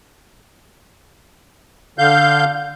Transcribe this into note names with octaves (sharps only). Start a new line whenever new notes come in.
D3 F5 G6